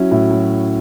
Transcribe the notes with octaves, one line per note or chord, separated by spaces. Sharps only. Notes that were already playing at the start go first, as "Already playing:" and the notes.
Already playing: F#3 C#4 E4
A2
F#3